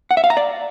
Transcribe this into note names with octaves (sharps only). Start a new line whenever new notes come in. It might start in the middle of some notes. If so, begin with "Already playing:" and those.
F#5
E5
F5
A#5
D5